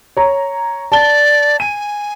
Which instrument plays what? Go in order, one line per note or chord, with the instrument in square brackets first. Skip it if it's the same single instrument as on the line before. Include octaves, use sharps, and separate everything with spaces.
[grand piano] C#5 A#5
[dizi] D5 [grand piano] A5 G7
[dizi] G#5 [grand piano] D#7